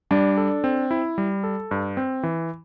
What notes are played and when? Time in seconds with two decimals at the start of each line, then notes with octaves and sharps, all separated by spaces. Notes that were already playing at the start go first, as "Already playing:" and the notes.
0.11 G3 D4
0.37 A4
0.64 C4
0.91 E4
1.18 G3
1.44 A4
1.71 G2
1.97 C4
2.23 E3